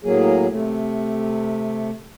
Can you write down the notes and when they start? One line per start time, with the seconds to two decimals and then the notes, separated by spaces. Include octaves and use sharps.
0.04 A2 F#3 A#3 G#4
0.51 C3 A3